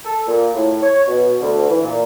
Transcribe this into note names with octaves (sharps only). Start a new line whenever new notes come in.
A4
A#2
A2
C#5
B2
D2
E3
A#2